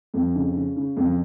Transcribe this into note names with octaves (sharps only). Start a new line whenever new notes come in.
F2
C#3
C#3
C#3
F2